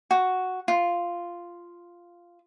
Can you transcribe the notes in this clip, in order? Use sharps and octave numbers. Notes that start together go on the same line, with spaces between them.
F#4
F4